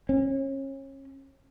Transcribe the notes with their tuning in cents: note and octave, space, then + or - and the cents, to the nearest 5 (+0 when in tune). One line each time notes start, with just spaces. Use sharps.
C#4 -30